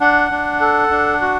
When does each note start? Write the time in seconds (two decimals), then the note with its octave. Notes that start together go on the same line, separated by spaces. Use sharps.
0.01 D4 F#5
0.31 D4
0.61 A4
0.90 D4
1.21 F#4